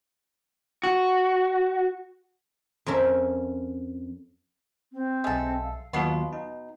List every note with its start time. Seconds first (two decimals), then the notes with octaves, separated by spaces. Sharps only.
0.83 F#4
2.86 F2 C#4 A#4 E5
4.93 C4
5.24 B1 G#3 A4 E5
5.63 F5
5.93 D#2 B2 F#3 B3 F4 C6
6.33 D#4